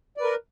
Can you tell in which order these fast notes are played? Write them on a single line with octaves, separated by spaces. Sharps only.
D5 B4 A#4